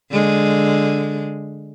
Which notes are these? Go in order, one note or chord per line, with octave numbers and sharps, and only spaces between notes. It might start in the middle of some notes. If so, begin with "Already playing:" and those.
D3 G#3